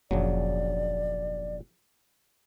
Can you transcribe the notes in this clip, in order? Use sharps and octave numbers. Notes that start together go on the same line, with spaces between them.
F1 A#1 C#3 F#3 D5